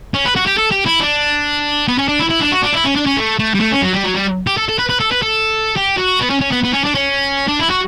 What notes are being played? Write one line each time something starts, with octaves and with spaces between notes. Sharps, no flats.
C#4
B4
F#4
G4
A4
G4
E4
D4
B3
C#4
D4
E4
E4
D4
F#4
D4
E4
C#4
D4
C#4
A3
A3
G3
A3
C#4
F#3
G3
F#3
G3
G4
A4
A4
B4
B4
A4
B4
A4
G4
F#4
B3
C#4
C#4
B3
B3
C#4
D4
C#4
D4
E4
F#4